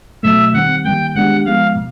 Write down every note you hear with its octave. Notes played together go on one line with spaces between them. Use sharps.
B2 F#3 A3 E5
D#3 G3 C4 F#5
D#3 G3 A#3 G5
D#3 G#3 B3 D4 G4 F#5
F3 G#3 B3 F5
B2